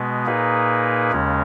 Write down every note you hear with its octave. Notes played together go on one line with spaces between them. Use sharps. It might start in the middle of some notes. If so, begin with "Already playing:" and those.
Already playing: B2 G#3 B3
A#2 A#3 D#4 G#4 B4
D#2 C#3 G#3 C#4